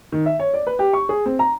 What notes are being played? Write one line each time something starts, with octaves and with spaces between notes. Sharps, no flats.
D#3
E5
C#5
D5
B4
G4
C#6
G#4
C4
A#5